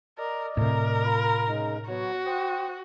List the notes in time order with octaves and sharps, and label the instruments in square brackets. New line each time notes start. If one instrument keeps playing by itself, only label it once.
[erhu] A#4 [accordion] D5 D#5
[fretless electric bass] A2 C3 [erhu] A#4
[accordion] F4 A#5 B5
C#3 G#3 D#4
[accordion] F#3 B3 C#5 [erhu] F#4
[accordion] C5 G5 D#6